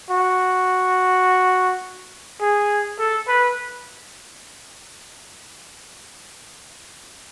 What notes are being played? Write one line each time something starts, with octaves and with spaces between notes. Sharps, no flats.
F#4
G#4
A4
B4